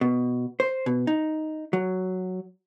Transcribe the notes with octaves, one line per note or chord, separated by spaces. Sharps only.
B2
C5
B2
D#4
F#3